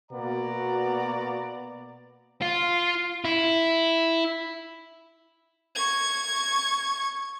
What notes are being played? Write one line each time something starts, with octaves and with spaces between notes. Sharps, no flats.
B2 A#3 B3 F#4 D5 A#5
F4
E4
C#6 G#6